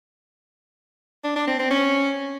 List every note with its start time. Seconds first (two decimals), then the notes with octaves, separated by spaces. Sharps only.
1.24 D4
1.36 D4
1.47 C4
1.59 C4
1.71 C#4